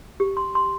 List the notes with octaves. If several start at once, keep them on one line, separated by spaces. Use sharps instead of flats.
G4
C6
C6